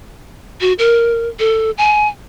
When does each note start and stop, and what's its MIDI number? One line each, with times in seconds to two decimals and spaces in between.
0.61 0.73 66
0.79 1.29 70
1.39 1.71 69
1.78 2.08 80